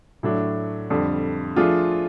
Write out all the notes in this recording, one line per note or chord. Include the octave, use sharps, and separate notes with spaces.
A2 F#3 A3 D4
F2 D3 G3
F3 A3 D4 F4 G#4